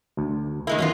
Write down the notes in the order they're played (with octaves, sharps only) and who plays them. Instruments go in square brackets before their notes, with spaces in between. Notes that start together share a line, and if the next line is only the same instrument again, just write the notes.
[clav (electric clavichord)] D2
[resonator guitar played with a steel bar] D#3 G#3 A#3 [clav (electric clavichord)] E4
[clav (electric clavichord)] F#2 E3 [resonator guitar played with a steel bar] A#3 B3 F4